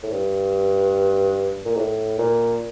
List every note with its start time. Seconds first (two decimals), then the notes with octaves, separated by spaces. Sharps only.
0.03 A2
0.12 G2
1.65 A#2
1.77 A2
2.19 A#2